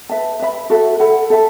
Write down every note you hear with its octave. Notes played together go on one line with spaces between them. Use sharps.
B4 E5 A5
B4 E5 B5
F#4 A4 E5
A4 F#5 B5
A4 E5 A5